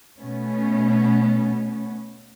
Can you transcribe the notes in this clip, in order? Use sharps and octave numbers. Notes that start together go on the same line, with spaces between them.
B2 A3 B3 C#4